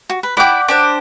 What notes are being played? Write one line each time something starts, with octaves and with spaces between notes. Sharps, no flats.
F#4
B4
E4 D5 F#5 G5 D6
D4 G4 C5